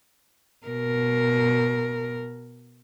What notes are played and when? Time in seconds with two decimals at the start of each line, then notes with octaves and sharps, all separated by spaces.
0.67 B2 A#4